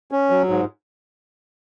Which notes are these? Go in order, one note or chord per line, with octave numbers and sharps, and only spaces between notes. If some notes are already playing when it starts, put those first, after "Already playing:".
C#4
F#3
G#2